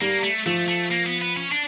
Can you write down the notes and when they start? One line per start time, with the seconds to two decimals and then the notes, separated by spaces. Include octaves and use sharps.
0.01 G3 A#3
0.23 A3
0.46 F3 A3
0.68 A3
0.92 A#3
1.06 B3
1.22 B3
1.37 C#4
1.52 D4